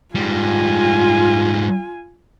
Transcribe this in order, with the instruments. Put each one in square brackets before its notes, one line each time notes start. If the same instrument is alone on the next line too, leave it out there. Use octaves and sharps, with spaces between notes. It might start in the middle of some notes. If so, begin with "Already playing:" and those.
[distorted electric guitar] G#2 G3 [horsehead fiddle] F4 G#5